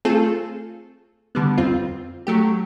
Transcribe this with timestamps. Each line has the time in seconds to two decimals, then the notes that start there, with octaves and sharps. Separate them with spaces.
0.05 A3 C4 F4 G#4 A4
1.35 D3 G3 B3
1.58 F2 C4 F4
2.27 F#3 A3 G4